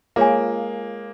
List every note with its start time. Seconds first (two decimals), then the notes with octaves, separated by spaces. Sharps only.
0.16 G#3 A#3 F4 G#4 C#5 F5 G#5